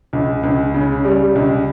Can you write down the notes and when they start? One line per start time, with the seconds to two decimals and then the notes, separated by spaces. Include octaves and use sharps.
0.13 C#2
0.43 C#2
0.74 C#3
1.05 G3
1.35 C#2